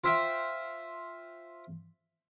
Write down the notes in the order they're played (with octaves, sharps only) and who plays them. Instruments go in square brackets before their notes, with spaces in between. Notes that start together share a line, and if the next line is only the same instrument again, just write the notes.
[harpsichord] F4 C5 E5 G5